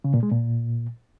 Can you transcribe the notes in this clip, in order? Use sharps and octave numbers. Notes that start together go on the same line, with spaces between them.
C#3
A#2
G#3
A#2